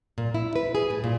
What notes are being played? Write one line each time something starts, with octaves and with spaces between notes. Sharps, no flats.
A#2
E4
B4
G#4
A2
A#2